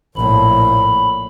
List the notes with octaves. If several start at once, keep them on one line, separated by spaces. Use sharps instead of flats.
A#1 A2 B5